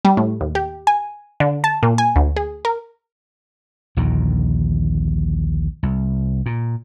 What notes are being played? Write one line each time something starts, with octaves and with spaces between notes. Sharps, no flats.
G3
A2
D#2
G4
G#5
D3
A5
A#2
G#5
D2
G#4
A#4
A#1 D#2 D3 D#3
C2
A#2